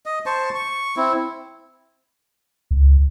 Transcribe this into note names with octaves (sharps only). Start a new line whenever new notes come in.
D#5
C5 A5 C#6
C#6
C4 E4
C#2